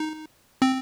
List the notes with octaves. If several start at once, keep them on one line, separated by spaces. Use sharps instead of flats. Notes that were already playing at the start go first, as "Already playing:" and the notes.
Already playing: D#4
C4